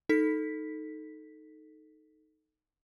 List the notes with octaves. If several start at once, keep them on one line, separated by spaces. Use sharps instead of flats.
D#4 A4 B6